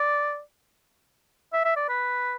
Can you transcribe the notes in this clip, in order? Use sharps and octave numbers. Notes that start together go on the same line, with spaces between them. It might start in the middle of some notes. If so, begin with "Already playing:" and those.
Already playing: D5
E5
E5
D5
B4